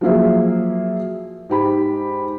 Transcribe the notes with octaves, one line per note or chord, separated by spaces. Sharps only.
F3 F#3 A#3 G#4 E5
G#2 G4 B5